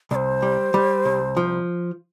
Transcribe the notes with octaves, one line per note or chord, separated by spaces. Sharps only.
C2 C5 D5
G3
G3
C2
F3